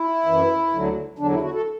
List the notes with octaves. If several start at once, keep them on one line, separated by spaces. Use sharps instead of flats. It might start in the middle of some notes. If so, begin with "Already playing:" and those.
Already playing: E4
F#2 E3
D2 D3 F#3
E2 D3 F#3 D4
E4
F#4
A4